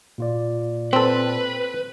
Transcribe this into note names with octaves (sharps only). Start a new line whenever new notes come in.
A#2 F4 D5
C4 A4 B4